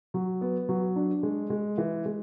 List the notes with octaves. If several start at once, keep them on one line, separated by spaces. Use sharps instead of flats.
F#3
B3
F#3
D4
G#3
G#3
E3
G#3